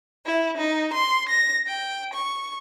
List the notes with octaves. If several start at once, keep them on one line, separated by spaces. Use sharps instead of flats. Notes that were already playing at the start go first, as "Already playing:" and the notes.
E4
D#4
C6
A#6
G5
C#6